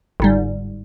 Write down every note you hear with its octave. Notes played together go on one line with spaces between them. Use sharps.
G1 G#2 G3